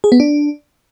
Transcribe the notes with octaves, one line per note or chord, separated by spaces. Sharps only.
G#4
B3
D4